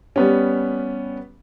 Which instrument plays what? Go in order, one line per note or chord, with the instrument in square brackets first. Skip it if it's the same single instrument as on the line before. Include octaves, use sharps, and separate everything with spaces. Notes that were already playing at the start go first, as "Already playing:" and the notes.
[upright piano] G3 B3 C#4